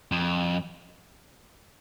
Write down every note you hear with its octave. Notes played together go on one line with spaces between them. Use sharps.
F2